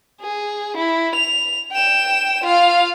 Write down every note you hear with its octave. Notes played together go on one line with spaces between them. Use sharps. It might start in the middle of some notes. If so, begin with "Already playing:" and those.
G#4
E4
F7
G5 E7
F4 F5